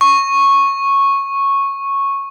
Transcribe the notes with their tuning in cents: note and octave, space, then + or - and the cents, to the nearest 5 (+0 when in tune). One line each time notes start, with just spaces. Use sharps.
C#6 -10